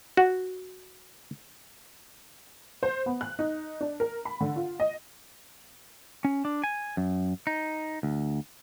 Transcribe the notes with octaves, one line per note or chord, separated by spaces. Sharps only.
F#4
C5
B3
F#6
D#4
D4
A#4
B5
D3
F4
D#5
C#4
D4
G#5
F#2
D#4
D2